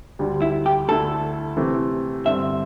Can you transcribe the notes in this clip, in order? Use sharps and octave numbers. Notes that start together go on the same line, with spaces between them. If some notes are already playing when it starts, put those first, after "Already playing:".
D2 D3 G3
E4
G4
D2 D3 A3 E4 A4
C3 E3 A3 C4
G2 D3 C4 E5